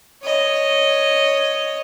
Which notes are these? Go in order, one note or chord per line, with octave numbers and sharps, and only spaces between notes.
C#5 D#5